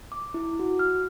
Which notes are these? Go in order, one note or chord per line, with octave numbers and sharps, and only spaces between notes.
D6
E4
F#4
F6